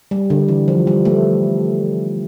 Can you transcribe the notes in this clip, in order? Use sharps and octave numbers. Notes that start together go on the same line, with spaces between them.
G3
D3
E3
F3
G3
A3